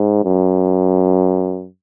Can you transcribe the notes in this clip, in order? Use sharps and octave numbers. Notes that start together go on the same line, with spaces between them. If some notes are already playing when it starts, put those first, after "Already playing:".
Already playing: G#2
F#2